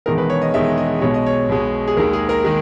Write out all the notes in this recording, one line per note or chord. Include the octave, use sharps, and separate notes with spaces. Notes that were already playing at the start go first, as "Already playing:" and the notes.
E1 E2 D#3 G#3 A#4
B4
C#5
D#5
E1 E2 D#3 G#3 E5
D#5
B1 B2 G#3 C#5
D#5
C#5
B1 B2 G#3
G#4
D#2 D#3 G#3 A#4
G#4
A#4
D#3 G#3 G#4